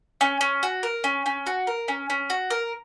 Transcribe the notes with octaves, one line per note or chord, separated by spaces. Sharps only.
C#4
C#4
F#4
A#4
C#4
C#4
F#4
A#4
C#4
C#4
F#4
A#4